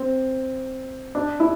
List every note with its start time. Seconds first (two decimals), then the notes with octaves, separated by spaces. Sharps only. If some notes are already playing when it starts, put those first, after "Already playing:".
Already playing: C4
1.15 D4
1.40 E4